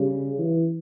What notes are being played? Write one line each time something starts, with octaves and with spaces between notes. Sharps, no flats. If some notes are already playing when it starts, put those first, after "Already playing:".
Already playing: C#3 G3
E3